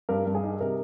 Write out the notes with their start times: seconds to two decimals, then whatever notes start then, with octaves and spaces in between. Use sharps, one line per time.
0.09 G2 A#4
0.26 G2
0.35 G#4
0.43 D#4
0.60 C3 A#4